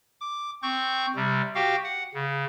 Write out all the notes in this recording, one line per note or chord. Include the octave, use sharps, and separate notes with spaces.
D6
C4 C#6 G6
C3 G3
F#4 G4 F5 G5
F#5
C#3